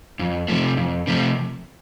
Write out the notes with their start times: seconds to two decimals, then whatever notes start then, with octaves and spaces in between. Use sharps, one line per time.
0.19 F2
0.48 C3 F3 A3
0.77 F2
1.07 C3 F3 A3